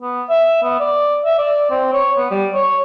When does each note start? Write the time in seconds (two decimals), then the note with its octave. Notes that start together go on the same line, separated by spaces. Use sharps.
0.02 B3
0.29 E5
0.63 B3
0.80 D5
1.25 E5
1.38 D5
1.71 C4
1.93 C#5
2.18 B3
2.31 G3
2.54 C#5